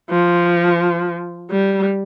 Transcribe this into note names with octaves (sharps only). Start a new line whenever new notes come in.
F3
G3